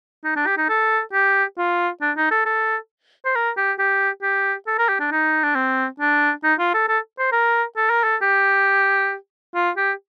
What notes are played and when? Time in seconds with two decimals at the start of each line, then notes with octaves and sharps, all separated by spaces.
0.24 D#4
0.36 D4
0.46 G4
0.58 D#4
0.69 A4
1.13 G4
1.58 F4
2.01 D4
2.17 D#4
2.31 A4
2.46 A4
3.25 C5
3.35 A#4
3.57 G4
3.79 G4
4.23 G4
4.67 A4
4.79 A#4
4.89 G4
5.00 D4
5.12 D#4
5.44 D4
5.55 C4
6.00 D4
6.44 D#4
6.60 F4
6.74 A4
6.88 A4
7.19 C5
7.32 A#4
7.77 A4
7.90 A#4
8.04 A4
8.22 G4
9.55 F4
9.77 G4